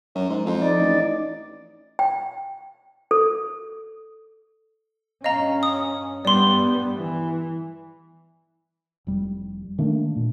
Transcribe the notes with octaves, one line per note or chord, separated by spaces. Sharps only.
F#2
G#2
F2
D#4 D5
A1
G5
A4
G2 C#4 D#5 F5 A#5
D#6
G2 G3 B3 D5 C6
E3
F1 G3
D#3 A3 A#3 D4
A#2